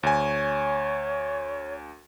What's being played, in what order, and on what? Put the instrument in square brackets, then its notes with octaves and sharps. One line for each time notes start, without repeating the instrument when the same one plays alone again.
[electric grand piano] D2 G#5 [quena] C#5